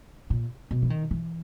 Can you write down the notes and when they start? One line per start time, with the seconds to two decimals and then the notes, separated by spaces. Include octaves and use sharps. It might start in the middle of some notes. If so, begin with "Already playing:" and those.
0.30 A#2
0.71 B2
0.82 E3
0.90 D#3
1.11 E3